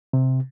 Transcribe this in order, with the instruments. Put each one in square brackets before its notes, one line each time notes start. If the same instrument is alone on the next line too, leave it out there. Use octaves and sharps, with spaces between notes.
[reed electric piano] C3